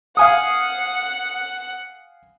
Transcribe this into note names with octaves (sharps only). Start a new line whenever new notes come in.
F5 F#5 G#5 D#6